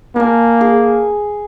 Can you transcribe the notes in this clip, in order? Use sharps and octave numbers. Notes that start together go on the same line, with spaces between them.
A#3 G#5 A5
G#4